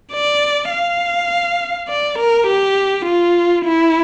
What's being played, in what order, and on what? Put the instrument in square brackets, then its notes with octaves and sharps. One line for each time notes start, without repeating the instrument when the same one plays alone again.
[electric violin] D5
F5
D5
A#4
G4
F4
E4